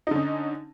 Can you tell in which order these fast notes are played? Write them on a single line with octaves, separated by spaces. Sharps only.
D#4 D3 C#4